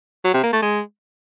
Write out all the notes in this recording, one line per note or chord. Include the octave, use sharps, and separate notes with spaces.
F#3
C3
A#3
A3
G#3